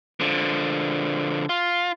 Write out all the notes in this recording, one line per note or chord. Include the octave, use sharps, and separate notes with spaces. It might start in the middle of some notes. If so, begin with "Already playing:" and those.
D3 F3
F4